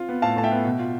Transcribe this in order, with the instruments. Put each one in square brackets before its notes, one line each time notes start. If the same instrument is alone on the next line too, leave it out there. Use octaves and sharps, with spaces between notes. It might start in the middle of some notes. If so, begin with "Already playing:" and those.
Already playing: [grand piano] C4 F4
B3
A2 F5 A5
A2 A5
E5 G5
B3
B2
F4